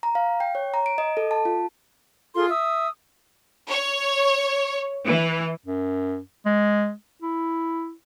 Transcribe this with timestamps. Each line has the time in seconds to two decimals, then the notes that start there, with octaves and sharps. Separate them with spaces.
0.03 A#5
0.15 F5
0.40 G5
0.55 C#5
0.74 A#5
0.86 D7
0.98 D#5
1.17 A4
1.31 A5
1.45 F4
2.34 F4 G#4 A4 C6
2.50 E5 D#6 E6
3.67 C#5
5.08 E3
5.66 F#2
6.46 G#3
7.22 E4